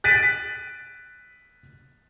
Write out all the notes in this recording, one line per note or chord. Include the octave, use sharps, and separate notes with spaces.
F#6 A6 B6 D7 D#7